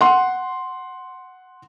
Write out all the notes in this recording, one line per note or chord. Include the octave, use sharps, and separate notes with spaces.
F#5 C6